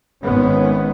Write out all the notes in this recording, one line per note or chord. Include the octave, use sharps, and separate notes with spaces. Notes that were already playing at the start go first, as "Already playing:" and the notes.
G#1 D#3 G#3 B3 C#4